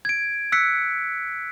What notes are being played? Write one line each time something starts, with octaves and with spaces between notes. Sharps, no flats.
G#6 D7
E6 F#6 B6 C#7